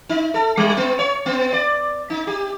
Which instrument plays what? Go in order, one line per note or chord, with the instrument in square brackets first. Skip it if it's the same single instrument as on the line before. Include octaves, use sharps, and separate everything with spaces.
[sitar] D#4
A4
G3
B3
C#5
B3
D5
D#4
G4